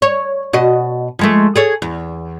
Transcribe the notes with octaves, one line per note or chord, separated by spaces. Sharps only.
C#5
B2 F#4 D#5
F3 G#3 A3
G#4 A4 C#5
E2